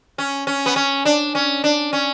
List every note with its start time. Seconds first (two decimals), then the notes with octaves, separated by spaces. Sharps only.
0.18 C#4
0.47 C#4
0.66 B3
0.76 C#4
1.05 D4
1.35 C#4
1.64 D4
1.93 C#4